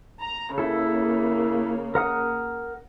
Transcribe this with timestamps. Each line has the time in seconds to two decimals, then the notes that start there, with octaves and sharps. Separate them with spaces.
0.20 A#5
0.58 C#3 A#3 E4 A4
1.95 A#4 F#5 D#6